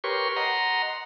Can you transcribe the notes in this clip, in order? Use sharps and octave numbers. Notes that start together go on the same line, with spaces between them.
G4 A#4 B4 C#5 C6 C#6
D#5 F#5 A#5 C6